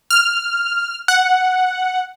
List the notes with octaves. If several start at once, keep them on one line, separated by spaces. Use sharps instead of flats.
F6
F#5